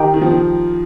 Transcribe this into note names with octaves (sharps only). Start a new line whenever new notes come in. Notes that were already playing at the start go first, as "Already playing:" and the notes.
Already playing: D#3 G4 A#4 D#5 G5
D#3
F3
D#3